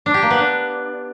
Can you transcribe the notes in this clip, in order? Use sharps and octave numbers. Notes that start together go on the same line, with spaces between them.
D4
G4
A#3
B3
D4